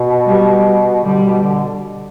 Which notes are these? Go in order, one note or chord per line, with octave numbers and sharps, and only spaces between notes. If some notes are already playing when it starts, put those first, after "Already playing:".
Already playing: B2
G3
D3 G3
B2
D3